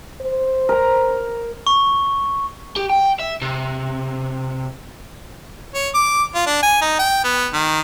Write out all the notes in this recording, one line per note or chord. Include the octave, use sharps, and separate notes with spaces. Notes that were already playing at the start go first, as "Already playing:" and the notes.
C5
A#4 A#5
C#6
G4
G5
E5
C3
C#5
D6
F4
D4
G#5
D#4
G5
B3
D#3